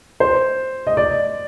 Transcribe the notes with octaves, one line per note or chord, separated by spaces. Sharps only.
C5
D#5
D5